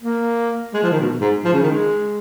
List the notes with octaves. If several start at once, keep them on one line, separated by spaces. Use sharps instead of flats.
A#3
G#3
F3
D#3
B2
G#2
F3
C#3
D#3
G#3